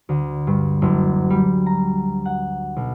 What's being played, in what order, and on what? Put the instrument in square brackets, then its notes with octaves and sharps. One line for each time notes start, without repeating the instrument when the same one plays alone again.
[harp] D2
G2
F#1
G3
A#5
F#5
B1